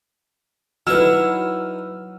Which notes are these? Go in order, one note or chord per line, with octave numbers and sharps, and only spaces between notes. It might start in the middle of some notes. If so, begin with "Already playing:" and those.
F#3 D#4 E4 B4 E6 F6 E7